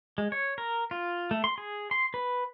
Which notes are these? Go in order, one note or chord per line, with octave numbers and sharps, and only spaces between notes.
G#3
C#5
A#4
F4
A3
C6
G#4
C6
B4